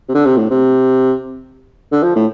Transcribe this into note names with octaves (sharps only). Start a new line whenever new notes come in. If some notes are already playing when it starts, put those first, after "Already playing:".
C3
D3
C3
A2
C3
D3
F3
A2